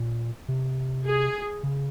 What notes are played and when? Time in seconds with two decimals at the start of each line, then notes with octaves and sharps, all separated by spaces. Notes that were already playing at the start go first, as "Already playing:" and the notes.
Already playing: A#2
0.48 C3
1.06 G#4
1.63 C#3